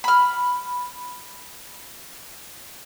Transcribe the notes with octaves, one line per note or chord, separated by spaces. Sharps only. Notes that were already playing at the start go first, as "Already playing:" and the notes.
B5 F6